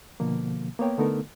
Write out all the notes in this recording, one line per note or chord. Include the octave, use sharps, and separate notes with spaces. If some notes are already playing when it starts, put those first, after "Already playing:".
B2 D3 F3 A#3
A#3 B3 C#5 G5
D3 A3 B3 D#4 A4 A#4